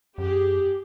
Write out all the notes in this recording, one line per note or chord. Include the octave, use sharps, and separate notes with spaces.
F#2 G4 G#4